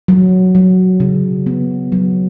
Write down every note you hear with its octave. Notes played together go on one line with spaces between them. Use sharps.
F#3
F#3
C#3
B3
F#3